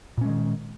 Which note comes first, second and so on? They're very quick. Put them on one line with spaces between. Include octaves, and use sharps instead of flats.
A#2 C#4 G#3 D#3